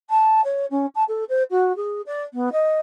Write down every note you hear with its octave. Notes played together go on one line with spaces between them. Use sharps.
A5
C#5
C#4
A5
A4
C5
F#4
G#4
D5
B3
D#5